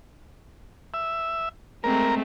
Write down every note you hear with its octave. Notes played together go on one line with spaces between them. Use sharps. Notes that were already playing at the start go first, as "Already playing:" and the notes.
E5
G#3 A3 C4 A#4